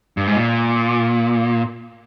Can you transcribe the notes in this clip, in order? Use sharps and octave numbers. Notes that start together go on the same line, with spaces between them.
G2
G#2
A#2